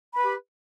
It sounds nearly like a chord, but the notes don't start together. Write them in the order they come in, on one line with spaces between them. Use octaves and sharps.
B5 B4 G4